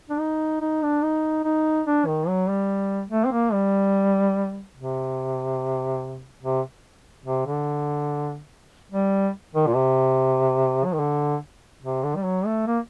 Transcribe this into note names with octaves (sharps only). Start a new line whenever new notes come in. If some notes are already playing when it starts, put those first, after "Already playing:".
D4
D#4
D#4
D4
D#4
D#4
D4
D#3
F#3
G3
A3
C4
A#3
G3
C3
C3
C3
D3
G3
D#3
A#2
C3
F#3
D#3
D3
C3
D3
G3
F#3
A3
A#3